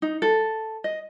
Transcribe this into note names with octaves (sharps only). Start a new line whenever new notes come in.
D#4
A4
D#5